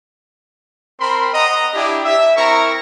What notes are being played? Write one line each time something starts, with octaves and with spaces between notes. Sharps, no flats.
C4 A#4 B5 C6
D#5 F#5 A#5 D#6
D4 E4 G4
E5
C4 E4 A#4 A#5 C#6